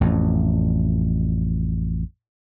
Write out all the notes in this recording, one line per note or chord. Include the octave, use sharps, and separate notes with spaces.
A1 F2